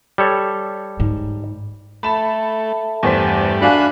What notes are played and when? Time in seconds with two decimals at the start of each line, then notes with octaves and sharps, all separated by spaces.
0.18 G3 A4 C#5
1.00 G#2
2.03 A3 A4 E5 A5 B5 E7
3.03 E2 G2 G3 A3 C5 B6
3.62 D4 F#4 F5 G#5 B5 F#6